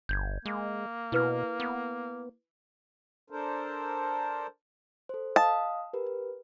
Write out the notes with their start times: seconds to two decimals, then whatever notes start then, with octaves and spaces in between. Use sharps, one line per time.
0.09 G1 G6 G#6
0.45 G#3 A#3
1.12 B2 E4 B4 F6
1.60 B3
3.30 D4 A4 A#4 C5
5.09 A4 C5
5.36 D#5 F5 A5 D#6
5.93 G4 A#4 B4